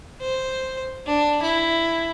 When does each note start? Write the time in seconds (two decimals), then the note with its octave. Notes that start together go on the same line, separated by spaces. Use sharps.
0.21 C5
1.06 D4
1.43 E4